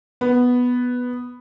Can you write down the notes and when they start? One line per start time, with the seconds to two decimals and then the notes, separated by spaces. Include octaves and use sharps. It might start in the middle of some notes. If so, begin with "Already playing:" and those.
0.21 B3